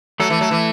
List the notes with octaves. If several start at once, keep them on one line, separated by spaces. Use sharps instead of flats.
F#3 A3 A4
E3
F#3
E3